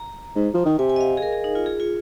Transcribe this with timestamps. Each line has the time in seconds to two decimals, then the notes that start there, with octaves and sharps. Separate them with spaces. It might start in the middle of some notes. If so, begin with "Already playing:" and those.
Already playing: A#5
0.35 G#2
0.54 F3
0.65 D#3
0.78 C3 G#5
0.89 G#5
0.96 D#5
1.01 F5
1.17 G#4
1.22 A#4
1.33 G#4
1.44 D#4
1.55 F4
1.66 G#4
1.80 F4